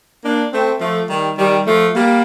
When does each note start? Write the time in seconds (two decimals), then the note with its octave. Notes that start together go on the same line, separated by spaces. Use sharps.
0.23 A#3 D4
0.52 A3 C4
0.80 F3 A3
1.09 D#3 G3
1.38 D#3 G3
1.67 F3 A3
1.95 G3 A#3